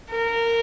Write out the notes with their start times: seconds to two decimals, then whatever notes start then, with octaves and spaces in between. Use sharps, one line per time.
0.11 A#4